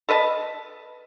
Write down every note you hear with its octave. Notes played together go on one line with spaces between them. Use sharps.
A4 B4 D#5 A5